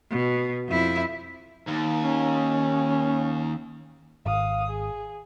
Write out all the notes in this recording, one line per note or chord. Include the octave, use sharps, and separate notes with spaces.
B2
F2 E4
D#2
C#4
G#1 F5 D#6
G#4